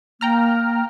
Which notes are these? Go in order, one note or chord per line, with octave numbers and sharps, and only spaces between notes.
A#3 G5 A#5 F6